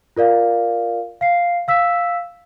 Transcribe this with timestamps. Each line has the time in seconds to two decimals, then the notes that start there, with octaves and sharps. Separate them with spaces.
0.16 F4 A#4 D5 F5
1.21 F5 C7
1.68 F5 E6 B6 E7